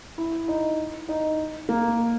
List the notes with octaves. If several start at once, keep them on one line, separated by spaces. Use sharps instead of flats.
E4
D#4
D#4
A#3